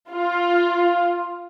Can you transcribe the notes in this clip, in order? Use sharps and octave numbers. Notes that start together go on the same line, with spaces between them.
F4